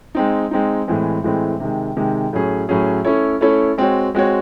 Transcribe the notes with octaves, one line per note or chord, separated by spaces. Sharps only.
G#3 C4 D#4
G#3 C4 D#4
A2 E3 G#3 C4
A2 E3 G#3 C4
C3 D#3 G#3
C3 D#3 G#3
A2 F#3 C#4 G#4
A2 F#3 C#4 G#4
A3 C#4 E4 A4 C#5
A3 C#4 E4 A4 C#5
G#3 C4 F#4 C#5
G#3 C4 F#4 C#5